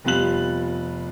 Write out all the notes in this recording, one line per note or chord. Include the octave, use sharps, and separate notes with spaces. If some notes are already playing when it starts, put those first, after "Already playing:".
F1 G3 B3 F4 F#6 F#7